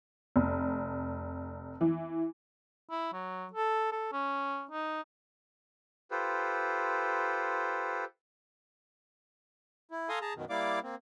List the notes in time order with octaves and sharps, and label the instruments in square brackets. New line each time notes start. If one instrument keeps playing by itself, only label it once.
[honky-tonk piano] F1
E3
[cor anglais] E4
F#3
A4
A4
C#4
D#4
[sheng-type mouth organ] F4 G4 A4 B4 C5
[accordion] E4
A4 F5 G#5 A#5 C6 D#6
G#4 A5 A#5
F#2 B2 D#3
G3 A#3 E4 D5 F5 D6
A#3 C4